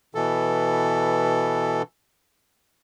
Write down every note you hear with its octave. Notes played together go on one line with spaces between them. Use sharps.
B2 E3 A4